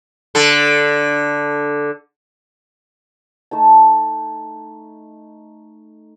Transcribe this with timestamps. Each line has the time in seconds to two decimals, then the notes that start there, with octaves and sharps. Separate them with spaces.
0.35 D3 A4
3.51 A3 D#4 A5